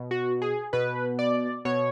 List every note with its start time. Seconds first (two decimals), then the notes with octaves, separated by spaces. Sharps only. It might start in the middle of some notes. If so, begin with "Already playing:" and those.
Already playing: B2
0.11 F#4
0.42 G#4
0.73 B2 B4
1.19 D5
1.65 B2 C#5